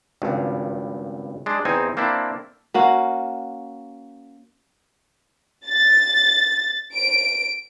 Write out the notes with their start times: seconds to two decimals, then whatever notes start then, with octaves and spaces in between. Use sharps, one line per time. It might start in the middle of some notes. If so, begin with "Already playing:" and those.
0.22 G#1 C#2 G2
1.46 G#3 D4
1.65 E2 C4 D#4 G#5
1.97 A#3 C4 D4 E4
2.74 A#3 C#4 F#4
5.67 A6
6.94 D7